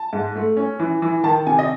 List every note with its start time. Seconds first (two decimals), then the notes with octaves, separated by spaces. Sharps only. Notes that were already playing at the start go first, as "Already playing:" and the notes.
Already playing: A5
0.13 G#2
0.35 A3
0.57 C#4
0.79 E3
1.02 E3
1.24 D#3 A5
1.47 C3 G#5
1.59 D#5